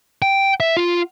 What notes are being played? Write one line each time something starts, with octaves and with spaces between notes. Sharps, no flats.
G5
E5
F4